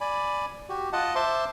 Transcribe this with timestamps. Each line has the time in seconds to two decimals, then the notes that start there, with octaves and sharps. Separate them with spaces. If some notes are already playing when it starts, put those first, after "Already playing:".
0.01 D5 G#5 B5
0.69 F#4 G4
0.93 F4 D#5 F#5 A5
1.15 C5 E5 A5 C6 D6